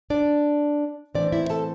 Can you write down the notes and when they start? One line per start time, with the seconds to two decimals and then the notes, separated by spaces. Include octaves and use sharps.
0.10 D4 D5
1.15 A2 E3 C4 D4 D5
1.32 E4 E5
1.50 A4 A5